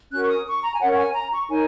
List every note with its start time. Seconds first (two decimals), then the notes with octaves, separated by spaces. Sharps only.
0.11 C#4 F#4 A#4 F#6
0.22 C#6
0.29 D#6
0.46 C#6
0.64 A#5
0.73 G#5
0.80 C#4 A#4 C#5 F#5
0.93 F#5
0.97 G#5
1.14 A#5
1.32 C#6
1.48 D#4 A#4 C#5 G#5